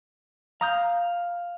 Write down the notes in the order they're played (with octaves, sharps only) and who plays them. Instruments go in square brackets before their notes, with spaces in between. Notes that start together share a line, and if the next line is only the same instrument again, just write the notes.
[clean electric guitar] F5 [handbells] A#5 D#6 G6